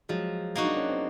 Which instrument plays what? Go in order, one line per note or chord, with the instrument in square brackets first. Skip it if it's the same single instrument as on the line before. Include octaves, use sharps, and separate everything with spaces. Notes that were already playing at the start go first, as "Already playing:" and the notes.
[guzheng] F3 [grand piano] F#3 G#3
[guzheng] A#3 D#4 F#4
[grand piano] D4
C#4
C4